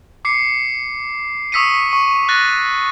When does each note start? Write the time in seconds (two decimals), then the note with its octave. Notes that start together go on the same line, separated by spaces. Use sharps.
0.25 D6 C7 C#7
1.52 C#6 D#6 E6 B6 C#7 D#7
1.91 C#6 D#7
2.29 F#6 A6 A#6 D#7